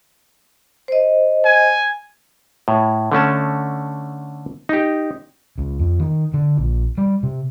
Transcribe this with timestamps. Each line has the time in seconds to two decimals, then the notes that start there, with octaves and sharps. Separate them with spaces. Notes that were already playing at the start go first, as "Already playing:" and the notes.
0.88 C5 D#5
1.45 G#5
2.68 A2
3.12 D3 A3 C#4 A5
4.69 D#4 G4
5.58 C#2
5.79 F2
6.00 D#3
6.34 D3
6.57 A#1
6.98 G3
7.23 C3